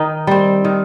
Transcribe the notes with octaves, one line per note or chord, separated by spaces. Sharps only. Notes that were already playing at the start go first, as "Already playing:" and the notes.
Already playing: D#3 D#4
G3 C4
D#3